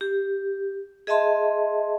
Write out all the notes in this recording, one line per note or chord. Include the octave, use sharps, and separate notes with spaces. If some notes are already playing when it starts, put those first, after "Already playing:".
G4
G#4 D#5 E5 A5 C6